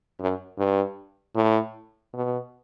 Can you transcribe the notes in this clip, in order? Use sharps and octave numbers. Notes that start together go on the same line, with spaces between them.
F#2
G2
A2
B2